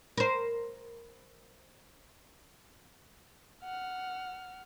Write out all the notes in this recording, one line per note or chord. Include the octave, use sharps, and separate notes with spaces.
A#4 C5
F#5 F6